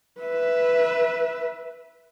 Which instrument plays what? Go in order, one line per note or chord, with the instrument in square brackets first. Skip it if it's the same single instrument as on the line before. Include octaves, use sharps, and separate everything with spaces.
[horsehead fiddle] B4 E5